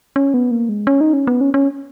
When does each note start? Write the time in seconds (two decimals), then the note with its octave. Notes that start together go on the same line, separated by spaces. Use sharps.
0.16 C#4
0.34 B3
0.51 A#3
0.69 G#3
0.87 C#4
1.01 D#4
1.13 C#4
1.27 B3
1.41 C#4
1.54 C#4